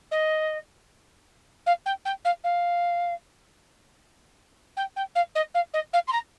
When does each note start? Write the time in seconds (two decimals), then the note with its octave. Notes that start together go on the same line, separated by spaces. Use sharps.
0.11 D#5
1.66 F5
1.85 G5
2.05 G5
2.24 F5
2.44 F5
4.76 G5
4.96 G5
5.15 F5
5.35 D#5
5.54 F5
5.73 D#5
5.93 F5
6.07 C6
6.12 A#5